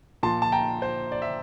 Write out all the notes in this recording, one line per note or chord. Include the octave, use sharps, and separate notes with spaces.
A#2 F3 A5 C6
A5
G5 A#5
C5
D5
E5